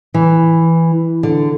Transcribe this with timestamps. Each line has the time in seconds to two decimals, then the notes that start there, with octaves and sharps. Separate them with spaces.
0.14 E3
1.23 D3